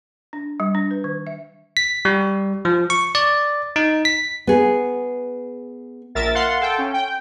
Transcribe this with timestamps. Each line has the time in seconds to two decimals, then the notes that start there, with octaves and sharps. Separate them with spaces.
0.33 D4
0.60 G3
0.75 D4
0.91 B4
1.04 D#3
1.27 E5
1.77 B6
2.05 G3
2.65 F3
2.90 C#6
3.15 D5
3.76 D#4
4.05 B6
4.47 B3 G#4
6.15 A#1 A#4 E5 A6
6.34 F5 F#5 C6
6.61 A4 G5
6.78 C#4
6.94 G5